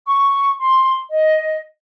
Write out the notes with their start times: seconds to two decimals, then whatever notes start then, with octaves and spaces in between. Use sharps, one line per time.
0.06 C#6
0.60 C6
1.11 D#5